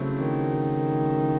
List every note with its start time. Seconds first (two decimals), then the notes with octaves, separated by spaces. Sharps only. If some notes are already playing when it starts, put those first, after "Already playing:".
Already playing: C#3 F#3 A3 C4 E4
0.18 D#3